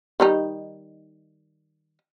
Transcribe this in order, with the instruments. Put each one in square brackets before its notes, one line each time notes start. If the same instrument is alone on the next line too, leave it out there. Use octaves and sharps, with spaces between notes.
[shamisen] D#3 G3 D#4